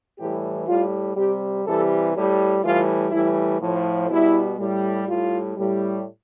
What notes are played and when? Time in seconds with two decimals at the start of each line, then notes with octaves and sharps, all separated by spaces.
0.19 A2 E3 G3 G4
0.68 A2 G3 F4
1.17 C3 G3 G4
1.66 C3 E3 G3 A4
2.15 A2 G3 G4
2.64 A2 E3 G3 F4
3.12 A2 E3 G3 E4
3.60 A2 F3
4.10 B2 G3 E4
4.58 A2 G3
5.07 A2 G3 F4
5.57 A2 G3